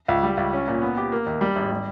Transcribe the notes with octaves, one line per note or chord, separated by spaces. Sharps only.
C#2
G3
C#2
C#4
A#2
B3
G4
A#3
D#2
G3
G#1
G3